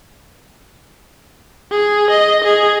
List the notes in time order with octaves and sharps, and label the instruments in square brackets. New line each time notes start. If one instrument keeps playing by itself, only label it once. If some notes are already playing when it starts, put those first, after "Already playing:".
[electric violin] G#4
D#5
G#4